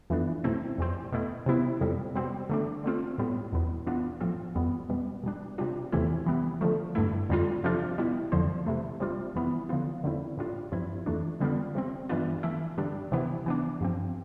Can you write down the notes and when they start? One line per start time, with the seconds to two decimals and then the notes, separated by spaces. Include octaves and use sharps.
0.10 F2 E3 B3 D4
0.44 B2 A3 C4 E4
0.78 F2 E3 G3 C4
1.13 B2 A3 E4
1.46 C3 G3 B3 E4
1.81 F2 C3 G3
2.15 B2 G3 C4
2.50 D3 A3 D4
2.84 D3 A3 C4 F4
3.18 A2 G3 B3
3.52 E2 B2 B3
3.87 E3 B3 D4 F4
4.21 A2 F3 C4 F4
4.55 F2 E3 G3 B3
4.89 B2 G3 B3
5.24 B2 G3 D4
5.58 C3 G3 D4 F4
5.92 E2 C3 E3 A3 E4
6.26 E3 G3 B3
6.61 D3 F3 A3
6.95 G2 D3 A3 E4
7.30 F2 D3 G3 D4 F4
7.64 C3 F3 A3 D4 F4
7.98 B2 G3 B3 E4
8.32 F2 D3 F3 C4
8.66 C3 E3 A3
9.00 C3 G3 D4 F4
9.35 F2 E3 B3 E4
9.69 D3 F3 B3 F4
10.04 E2 D3 A3 C4 E4
10.37 A2 G3 D4 F4
10.72 G2 F3 C4 E4
11.06 F2 E3 A3 D4
11.40 D3 G3 B3 D4 F4
11.75 C3 G3 C4
12.09 G2 E3 B3 D4 F4
12.43 E3 A3 E4
12.78 G2 D3 G3 D4
13.12 C3 E3 B3 E4
13.46 E3 B3 D4
13.81 G2 F3 C4